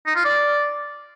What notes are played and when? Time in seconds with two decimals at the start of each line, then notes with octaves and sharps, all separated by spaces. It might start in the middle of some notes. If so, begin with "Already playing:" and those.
0.06 D#4
0.16 F4
0.25 D5